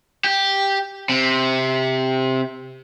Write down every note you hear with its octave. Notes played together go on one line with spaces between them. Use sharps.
G4
C3